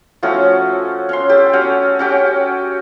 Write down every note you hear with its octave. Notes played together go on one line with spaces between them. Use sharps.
F3 A3 C#4 F#4
C#4 C6
G4 A4
C#4 F#4
C#4 F#4 G4